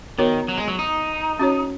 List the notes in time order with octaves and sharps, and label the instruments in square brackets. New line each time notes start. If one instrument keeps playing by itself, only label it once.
[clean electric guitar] D#3 [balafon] B3 F#4 A#4 C#5
[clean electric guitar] F#3
G#3
F#3
D#4
[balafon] C#4 F#4 C#5